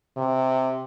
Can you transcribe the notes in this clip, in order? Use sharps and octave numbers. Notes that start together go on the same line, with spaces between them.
C3